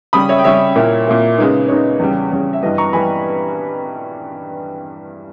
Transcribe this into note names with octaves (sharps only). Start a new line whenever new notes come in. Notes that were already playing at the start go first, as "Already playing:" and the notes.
C#3 G3 C#4 B5 D#6
C#5 E5
G5
C#3 G3 C#4 C#5 E5
A#2 A#3 E4
A#2 A#3 E4
C#3 G#3 B3 D#4
C#3 G#3 B3 D#4 C#5
E2 C#3 G3
E2 C#3 G3
E5
G2 E3 G3 B3 D#5
A#5 C#6
E3 G3 B3 G#5 B5